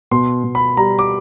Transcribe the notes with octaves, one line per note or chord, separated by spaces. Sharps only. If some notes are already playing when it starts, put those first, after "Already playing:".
B2 C6
B2
B5
G3 A#5
D6